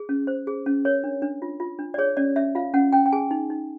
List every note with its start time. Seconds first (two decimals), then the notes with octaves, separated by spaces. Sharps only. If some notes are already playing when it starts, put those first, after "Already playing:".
Already playing: G#4
0.09 C#4
0.27 C5
0.47 G#4
0.66 C#4
0.85 A#4 C#5
1.04 D4
1.22 D4
1.42 F4
1.60 F4
1.79 D4
1.94 D5
1.98 G#4 C#5
2.17 C#4 D5
2.36 C#4 E5
2.55 F4 F5
2.74 C#4 F#5
2.93 C#4 G5
3.06 G5
3.13 G#4 G#5
3.31 D#4
3.50 D#4